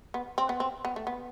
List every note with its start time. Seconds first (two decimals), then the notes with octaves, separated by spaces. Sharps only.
0.14 B3
0.38 C4
0.49 B3
0.60 C4
0.85 B3
0.96 A3
1.07 B3